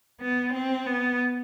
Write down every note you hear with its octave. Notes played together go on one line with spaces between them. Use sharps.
B3
C4
B3